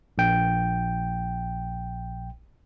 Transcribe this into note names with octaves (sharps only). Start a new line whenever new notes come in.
A#1 G5